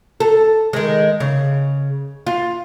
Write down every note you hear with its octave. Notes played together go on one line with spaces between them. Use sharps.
A4
D#3 G#3
C#3
F4